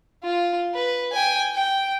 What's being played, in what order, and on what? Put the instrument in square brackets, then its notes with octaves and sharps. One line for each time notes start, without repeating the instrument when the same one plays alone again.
[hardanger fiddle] F4
B4
G5 G#5
G5